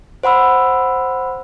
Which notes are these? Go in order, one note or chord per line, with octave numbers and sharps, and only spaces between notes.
C5 F#5 B5 E6